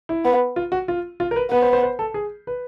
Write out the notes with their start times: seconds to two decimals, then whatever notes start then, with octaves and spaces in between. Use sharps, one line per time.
0.09 E4
0.25 B3
0.56 F4
0.72 F#4
0.88 F4
1.20 F4
1.31 A#4
1.36 B4
1.51 B3 B4
1.62 C5
1.73 C5
1.83 C5
1.99 A4
2.14 G#4
2.47 B4